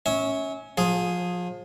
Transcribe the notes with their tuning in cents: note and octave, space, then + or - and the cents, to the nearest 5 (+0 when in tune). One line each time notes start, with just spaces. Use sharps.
C#4 +0 E5 -30
F3 +30 G#4 +0